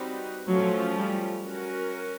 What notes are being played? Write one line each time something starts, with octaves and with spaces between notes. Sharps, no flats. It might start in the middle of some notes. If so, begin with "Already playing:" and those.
Already playing: G3 C4 D#4 F#4 B4
F3 F#3 A3 C#4 F4
G3
C#4 F#4 A#4